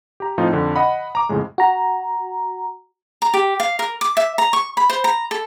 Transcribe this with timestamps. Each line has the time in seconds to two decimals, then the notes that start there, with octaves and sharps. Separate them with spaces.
0.20 G4 A#5
0.38 A2 F3 C4 D#4 F4
0.53 F2 D3
0.76 D#5 F#5 B5
1.15 A#5 D6
1.29 F2 A2 C#3 G#3
1.58 F#4 A#5
3.22 A#5
3.34 G4
3.60 F5
3.79 A#4
4.01 D6
4.17 E5
4.38 A#5
4.53 C#6
4.77 B5
4.90 C5
5.04 A#5
5.31 A4